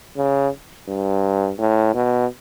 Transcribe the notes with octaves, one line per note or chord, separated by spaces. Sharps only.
C#3
G2
A2
B2